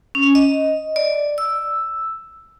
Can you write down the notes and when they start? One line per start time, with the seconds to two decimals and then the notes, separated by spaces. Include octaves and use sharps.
0.15 C#4
0.35 D#5
0.96 D5
1.38 E6